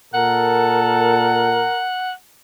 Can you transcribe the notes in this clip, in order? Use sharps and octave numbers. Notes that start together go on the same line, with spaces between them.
A#2 A4 A#4 F#5